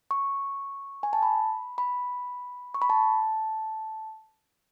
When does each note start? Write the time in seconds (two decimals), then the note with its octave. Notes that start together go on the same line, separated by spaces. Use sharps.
0.11 C#6
1.03 G#5
1.13 A5
1.23 B5
1.78 B5
2.74 C#6
2.82 B5
2.90 A5